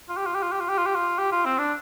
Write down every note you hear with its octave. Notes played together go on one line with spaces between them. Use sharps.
F4
G4
F4
G4
F4
G4
F4
G4
F4
G4
F4
G4
F4
C4
D4